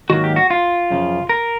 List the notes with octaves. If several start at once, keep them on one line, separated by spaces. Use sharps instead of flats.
G#2 D#3 F#3 A#3 F#4
G4
F#4
F4
F#2 C#3 F3
A#4